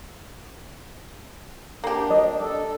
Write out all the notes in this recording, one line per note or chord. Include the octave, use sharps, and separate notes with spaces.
A#3 D4 G4
D#5
D4 A4